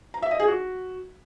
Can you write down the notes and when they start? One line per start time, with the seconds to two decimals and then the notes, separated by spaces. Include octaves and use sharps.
0.14 A#5
0.22 E5
0.31 D#5
0.40 G#4
0.48 F#4